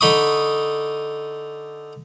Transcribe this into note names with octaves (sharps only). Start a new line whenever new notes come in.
D3 D#4 B5 C#6 D#6